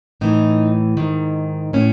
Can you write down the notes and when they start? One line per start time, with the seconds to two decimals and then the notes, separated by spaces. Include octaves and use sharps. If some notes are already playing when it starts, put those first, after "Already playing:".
0.21 A2 E3 D#4
0.97 G#2 D#3
1.73 A2 E3 C#4